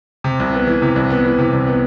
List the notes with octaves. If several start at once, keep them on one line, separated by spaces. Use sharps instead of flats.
C3
C2
B3
E3
C3
C2
B3
E3
C3
C2
B3